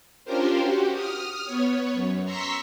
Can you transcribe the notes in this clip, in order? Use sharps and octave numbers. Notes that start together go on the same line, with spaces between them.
C#4 D4 F4 G4 A#4 C5
F#4 G4
D#6 F6
B3 C#5
F#2
A#5 C6 C#6 E6 B6